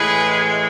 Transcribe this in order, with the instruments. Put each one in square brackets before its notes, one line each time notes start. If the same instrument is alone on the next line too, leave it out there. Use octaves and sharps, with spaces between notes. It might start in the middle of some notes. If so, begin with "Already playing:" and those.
Already playing: [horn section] A2 E3 G#3 G#4 B4